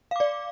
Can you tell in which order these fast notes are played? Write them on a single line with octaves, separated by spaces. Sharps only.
F5 D6 D5